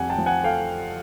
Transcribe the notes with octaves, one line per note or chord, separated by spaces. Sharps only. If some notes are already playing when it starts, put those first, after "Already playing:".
Already playing: F2 G3 F#5 G#5
G5 A5
F3
F#5 G#5
A3 F5 G5